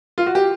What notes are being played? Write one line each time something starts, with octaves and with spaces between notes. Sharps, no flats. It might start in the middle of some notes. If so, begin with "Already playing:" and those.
F4
F#4
G4